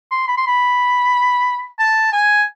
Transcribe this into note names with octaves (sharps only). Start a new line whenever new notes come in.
C6
B5
C6
B5
A5
G#5